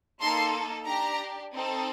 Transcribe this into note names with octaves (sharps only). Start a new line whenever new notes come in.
A#3 D#4 A4 C6
D4 G4 A#5
C4 D#4 A4